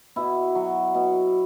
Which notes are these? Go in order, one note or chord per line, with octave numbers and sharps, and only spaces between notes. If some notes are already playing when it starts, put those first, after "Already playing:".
B2 E4
F#3
B2